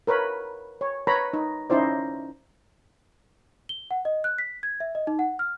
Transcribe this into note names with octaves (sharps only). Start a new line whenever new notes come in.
A#4 B4 C#5 B5
C#5
B4 C#5 A#5 B5
D#4
C#4 D#4 E4 C5 D5
G7
F#5
D#5
F#6
B6
G#6
E5
D#5
D#4
F#5
F6